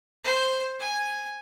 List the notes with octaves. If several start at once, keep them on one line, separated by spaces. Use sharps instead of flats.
C5
G#5